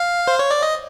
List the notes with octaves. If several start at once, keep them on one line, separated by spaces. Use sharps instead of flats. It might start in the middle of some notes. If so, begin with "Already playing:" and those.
Already playing: F5
C5
C#5
D5
D#5